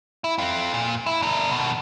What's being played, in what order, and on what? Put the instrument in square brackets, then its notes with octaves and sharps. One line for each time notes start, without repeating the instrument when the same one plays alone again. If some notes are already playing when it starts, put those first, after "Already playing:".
[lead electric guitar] E4
C4 F4
A#2
E4
D4 A#4
B2 D#3